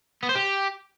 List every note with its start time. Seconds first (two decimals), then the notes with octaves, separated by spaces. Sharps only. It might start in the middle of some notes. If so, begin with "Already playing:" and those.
0.23 B3
0.29 C5
0.35 G4